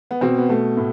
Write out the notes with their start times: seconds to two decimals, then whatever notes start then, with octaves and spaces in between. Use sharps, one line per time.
0.11 B3
0.21 B2 C4
0.38 B3
0.49 B2 A3
0.77 A2